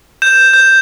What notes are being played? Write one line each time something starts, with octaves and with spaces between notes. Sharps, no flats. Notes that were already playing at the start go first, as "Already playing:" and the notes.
G6 E7
G6